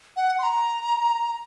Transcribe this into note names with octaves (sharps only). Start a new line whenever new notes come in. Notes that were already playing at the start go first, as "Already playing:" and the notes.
F#5
C6
A#5